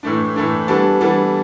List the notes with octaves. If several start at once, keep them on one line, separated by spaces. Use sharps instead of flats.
A2 E3 A3 D4
A2 E3 A3 D4
E3 G3 B3 D4 A4
E3 G3 B3 D4 A4